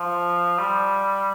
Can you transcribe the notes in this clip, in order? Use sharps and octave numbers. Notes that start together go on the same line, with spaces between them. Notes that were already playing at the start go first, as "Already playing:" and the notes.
Already playing: F3
G3